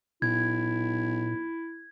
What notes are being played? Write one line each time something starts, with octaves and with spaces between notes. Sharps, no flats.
B1 A#2 E4 G#6